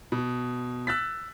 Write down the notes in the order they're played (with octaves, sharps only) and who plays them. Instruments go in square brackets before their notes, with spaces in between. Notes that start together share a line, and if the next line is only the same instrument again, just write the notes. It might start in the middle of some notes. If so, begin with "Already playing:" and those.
[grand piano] B2
E6 F#6 A6 B6